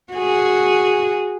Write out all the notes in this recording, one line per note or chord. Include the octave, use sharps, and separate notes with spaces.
F#4 G#4